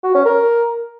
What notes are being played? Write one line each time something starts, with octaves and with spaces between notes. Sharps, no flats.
F#4
C#4
A#4